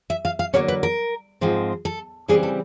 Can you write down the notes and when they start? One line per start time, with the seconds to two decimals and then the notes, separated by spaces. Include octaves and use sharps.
0.10 E5
0.25 F5
0.39 F5
0.54 D3 F#3 A#3 C#4 C#5
0.68 B4
0.83 A#4
1.41 G#2 F3 G#3 C4
1.85 A4
2.28 C#3 E3 G3 C4 G#4
2.43 A4